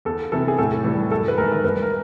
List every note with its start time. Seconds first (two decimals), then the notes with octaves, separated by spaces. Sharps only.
0.05 E2 A4
0.32 C3 E3 A4
0.48 G#4
0.58 A2 A4
0.84 E3 G3
1.11 F#2 A4
1.28 B4
1.38 D#3 G#3 A#4
1.52 A#4
1.64 G2 B4
1.83 A#4